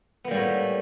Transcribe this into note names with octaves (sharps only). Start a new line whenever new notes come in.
A2 G3 A#3 B3